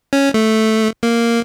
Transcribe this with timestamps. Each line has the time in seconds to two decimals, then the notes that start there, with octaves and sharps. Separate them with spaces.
0.13 C#4
0.34 A3
1.03 A#3